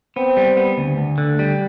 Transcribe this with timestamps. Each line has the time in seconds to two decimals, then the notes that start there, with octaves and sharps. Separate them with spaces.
0.16 B3 C4
0.37 G3
0.57 B3
0.78 D2
0.98 D2
1.18 D3
1.39 G3